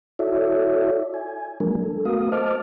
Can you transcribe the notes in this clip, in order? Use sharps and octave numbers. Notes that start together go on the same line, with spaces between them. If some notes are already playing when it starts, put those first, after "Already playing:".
E4 F#4 A4 C#5 D5 E5
G#5
F3 F#3 G#3 A#3 D4 A#4
A4
A3 B3 F#4 A#4 F5 D#6
C5 D#5 A5 D6 F6